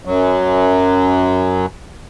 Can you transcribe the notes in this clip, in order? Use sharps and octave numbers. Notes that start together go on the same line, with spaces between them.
F#2 F#3